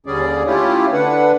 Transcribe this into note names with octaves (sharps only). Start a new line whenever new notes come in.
D#2 D3 G3 C#4 G#4 D5
A3 C#4 E4 F4 G4
D3 D4 B4 F#5